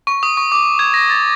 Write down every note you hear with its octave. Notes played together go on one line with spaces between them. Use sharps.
C#6
D#6
C#6
D6
G#6
A#6
A6